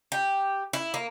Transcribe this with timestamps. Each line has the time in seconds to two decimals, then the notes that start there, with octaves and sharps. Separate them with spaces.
0.12 G4
0.73 E4
0.94 A#3